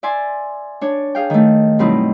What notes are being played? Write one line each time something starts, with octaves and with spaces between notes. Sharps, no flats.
D5 E5 G#5 C6
D4 C#5
G#4 F5 G5
D#3 A3
G2 B2 F#3 C4 D#4 E4